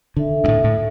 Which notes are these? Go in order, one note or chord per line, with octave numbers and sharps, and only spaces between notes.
D3 D4 A4 E5
F#2
A2
A2